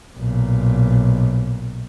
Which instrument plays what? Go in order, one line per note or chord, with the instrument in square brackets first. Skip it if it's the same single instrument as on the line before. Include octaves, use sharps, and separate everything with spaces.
[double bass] B1 A#2